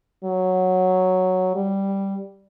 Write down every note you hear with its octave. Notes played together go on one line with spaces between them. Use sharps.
F#3
G3